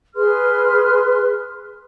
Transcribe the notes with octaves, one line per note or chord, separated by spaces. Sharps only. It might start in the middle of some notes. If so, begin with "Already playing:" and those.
G#4 B4 C6 F6